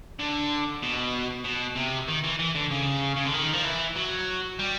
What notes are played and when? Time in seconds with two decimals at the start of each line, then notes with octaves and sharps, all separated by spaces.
0.19 D3
0.83 B2
1.45 B2
1.76 C3
2.08 D#3
2.24 E3
2.39 E3
2.55 D3
2.71 C#3
3.16 C#3
3.25 D3
3.34 D#3
3.54 F3
3.65 E3
3.96 F#3
4.59 G3